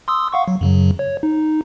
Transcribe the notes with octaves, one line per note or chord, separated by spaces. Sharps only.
C6 D#6 E6
F5 F#5 C#6
F#3
F#2 C#3 F#3
C#5
D#4